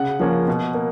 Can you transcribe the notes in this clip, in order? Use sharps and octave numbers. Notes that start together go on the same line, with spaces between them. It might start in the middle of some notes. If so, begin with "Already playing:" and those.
Already playing: C#3 F#5
F3 A#3 C#4
B2
A#3